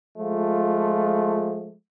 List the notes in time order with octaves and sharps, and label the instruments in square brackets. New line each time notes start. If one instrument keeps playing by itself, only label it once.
[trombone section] F3 G#3 A3 F4